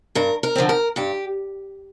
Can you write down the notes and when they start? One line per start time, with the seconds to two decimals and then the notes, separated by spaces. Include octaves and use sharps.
0.15 G2 A#4
0.43 A#4
0.55 D3 F3 C4
0.69 A#4
0.96 G2 G4